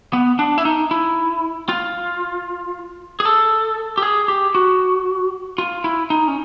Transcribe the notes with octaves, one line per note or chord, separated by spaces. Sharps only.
B3
D4
E4
D#4
E4
F4
G#4
A4
G4
G#4
G4
F#4
F4
E4
D#4
C#4